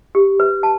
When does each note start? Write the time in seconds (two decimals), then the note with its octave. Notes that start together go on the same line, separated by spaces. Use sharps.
0.15 G4
0.40 B4
0.63 A5